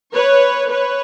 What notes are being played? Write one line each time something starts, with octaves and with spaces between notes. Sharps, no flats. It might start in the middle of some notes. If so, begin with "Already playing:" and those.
B4 C#5
B4 C#5